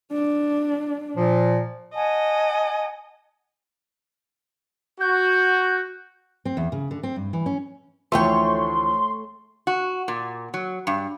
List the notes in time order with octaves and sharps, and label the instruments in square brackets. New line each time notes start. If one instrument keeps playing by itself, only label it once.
[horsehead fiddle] D4
[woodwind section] A#2 F3
[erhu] D#5 [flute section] F#5 G#5 A5
[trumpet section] F#4 [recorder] G6
[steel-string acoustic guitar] C4
E2
C#3
D3
C4
G2
E3
C#4
[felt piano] D2 E3 F3 [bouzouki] A3 C#5 G5 [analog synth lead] C6
[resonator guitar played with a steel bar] F#4
A#2
F#3
G2